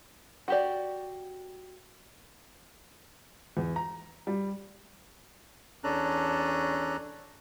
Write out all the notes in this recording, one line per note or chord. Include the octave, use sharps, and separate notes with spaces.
F#4 G4 D5
E2
A#5
G3
E2 C#4 D4 A4 A#5 F#6